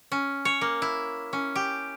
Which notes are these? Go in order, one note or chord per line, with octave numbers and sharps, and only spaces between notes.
C#4
C#5
A#3
E4
C#4
G4